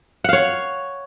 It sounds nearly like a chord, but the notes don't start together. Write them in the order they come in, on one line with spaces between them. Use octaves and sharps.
F#5 F5 C#5